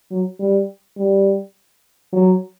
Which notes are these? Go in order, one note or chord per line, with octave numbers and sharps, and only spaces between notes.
F#3
G3
G3
F#3